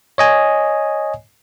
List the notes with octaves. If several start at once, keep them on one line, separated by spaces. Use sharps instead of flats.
C#5 D#5 G#5